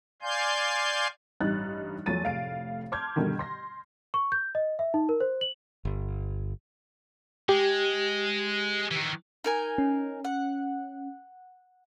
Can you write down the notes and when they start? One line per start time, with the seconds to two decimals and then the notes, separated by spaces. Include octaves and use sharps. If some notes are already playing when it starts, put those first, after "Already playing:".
0.22 D5 F5 G#5 C6 G6
1.40 A1 G2 D#4 F#6 A6
2.06 E2 F3 F#3 A3 A6 D#7
2.23 F1 A2 F5 D7
2.92 A5 C6 D6 F6 G6 G#6
3.16 G2 B2 D3 D#3
3.39 C6 A#6
4.14 C#6
4.32 G6
4.55 D#5
4.79 E5
4.94 D#4
5.09 A#4
5.21 C5
5.41 F#7
5.85 G1
7.49 G#3 G4
8.91 D#3 E3
9.44 D#4 A#4 G#5
9.78 C#4
10.25 F#5